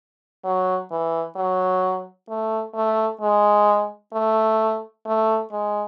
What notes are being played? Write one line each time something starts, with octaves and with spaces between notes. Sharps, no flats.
F#3
E3
F#3
A3
A3
G#3
A3
A3
G#3